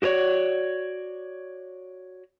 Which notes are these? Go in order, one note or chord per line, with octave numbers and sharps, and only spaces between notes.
F#4 G4 B4 C#5 D5